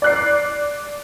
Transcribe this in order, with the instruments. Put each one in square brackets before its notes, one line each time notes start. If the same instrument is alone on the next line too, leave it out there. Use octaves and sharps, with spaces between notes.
[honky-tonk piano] D5 F#6 C7